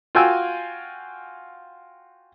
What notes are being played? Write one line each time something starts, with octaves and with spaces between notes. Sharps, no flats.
F4 F#4 F5 G5 G#5 E6